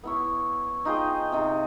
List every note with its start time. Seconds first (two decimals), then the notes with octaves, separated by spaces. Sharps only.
0.04 B3 E4 C#5
0.85 D#4 F4 G#4 G5
1.32 C3 D#4